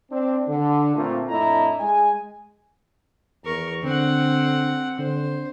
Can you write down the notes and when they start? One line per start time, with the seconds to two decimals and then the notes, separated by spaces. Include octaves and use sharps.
0.12 C4 D4
0.48 D3
0.96 A#2 A3 A#3 C4 F4
1.29 F2 A2 D4 E4 D#5 A#5
1.80 G#3 G#5
3.45 E2 A#4 C#6
3.83 D3 C4 F#5
4.99 D3 C5